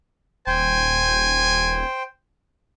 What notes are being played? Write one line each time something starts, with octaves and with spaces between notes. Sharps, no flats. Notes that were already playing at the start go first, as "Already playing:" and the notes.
D#1 C5 G5 G#5